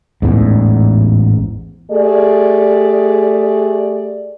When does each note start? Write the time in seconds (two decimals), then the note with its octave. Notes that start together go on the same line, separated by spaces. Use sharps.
0.22 A1 E2 G#2
1.91 A3 G4 G#4 D5